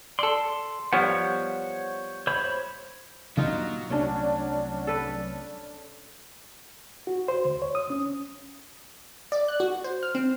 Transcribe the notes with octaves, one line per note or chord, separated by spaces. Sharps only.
A4 D5 C6
F3 G3 B3 C5 C#5 F#5
C5 C#5 B5
A#2 F#3 G3 D4 D#4 F4
C2 A3 C#4 D4
A4 B4
F#4
C5
D2
C#5
D#6
C#4
D5
F#6
F#4
C5
F6
C4